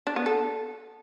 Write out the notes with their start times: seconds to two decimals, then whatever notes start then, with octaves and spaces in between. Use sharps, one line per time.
0.07 D4
0.16 B3
0.26 A4